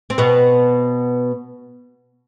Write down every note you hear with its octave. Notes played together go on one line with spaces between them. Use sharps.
C4
B2 B3